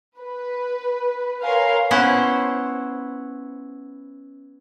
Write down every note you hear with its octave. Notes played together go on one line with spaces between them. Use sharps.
B4
A#4 B4 C#5 F5 G#5 C6
B3 C#4 E4 C5 F#5